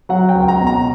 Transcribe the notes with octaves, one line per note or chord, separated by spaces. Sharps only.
F#3 F#5
G5
C#2
A#5
B2
A#5